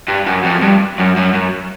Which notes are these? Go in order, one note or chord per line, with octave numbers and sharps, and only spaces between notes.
G2
F#2
F2
G2
F#2
F#2
F#2